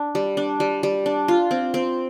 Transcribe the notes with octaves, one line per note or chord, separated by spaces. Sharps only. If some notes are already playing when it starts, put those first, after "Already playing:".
Already playing: D4
G3
D4
G3
G3
D4
F4
C4
C4